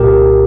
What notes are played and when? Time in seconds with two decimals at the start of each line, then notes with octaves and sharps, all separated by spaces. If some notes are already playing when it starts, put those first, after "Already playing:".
Already playing: C2 A#2 G4 A#4